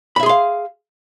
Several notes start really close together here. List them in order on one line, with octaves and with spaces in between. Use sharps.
B5 E5 G#4 C6 F5